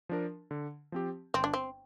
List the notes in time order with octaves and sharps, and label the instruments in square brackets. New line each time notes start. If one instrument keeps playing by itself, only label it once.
[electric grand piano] F3 D4 A#4
D3
F3 C4 G4
[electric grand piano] G1 [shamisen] C4
[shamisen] D4
C4